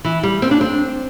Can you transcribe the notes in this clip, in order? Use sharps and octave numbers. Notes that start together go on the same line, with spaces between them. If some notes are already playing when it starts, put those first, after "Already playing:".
E3
G3
C4
D4
C4